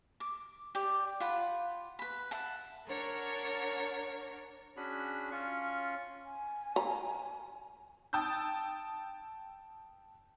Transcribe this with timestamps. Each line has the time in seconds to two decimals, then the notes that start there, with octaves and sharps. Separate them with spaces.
0.20 D6
0.75 G4 D5
1.20 F4 F#5 B5
1.99 B4 B5
2.31 E5 F#5 A5
2.86 D4 A#4 C#5 F#5
4.77 C#4 D4 F#4 G#4 B5
5.31 C#4 F4 C#6
6.24 G#5
6.76 A#5
8.13 G5 A5 D#6 E6 G6